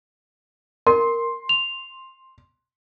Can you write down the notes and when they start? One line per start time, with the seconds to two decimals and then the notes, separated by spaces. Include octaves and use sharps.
0.87 A#4 C6
1.49 F7